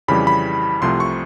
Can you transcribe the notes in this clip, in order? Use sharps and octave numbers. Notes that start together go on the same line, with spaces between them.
F2 C#3 E3 G3 B5
B5
C2 C3 F3 A3 C6
C#6